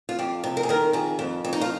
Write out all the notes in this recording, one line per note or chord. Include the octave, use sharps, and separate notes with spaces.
F4
F2 G4
C3
A#4
G#4
D#3 A#4
F2 G#4
F2
F2
D#4
F4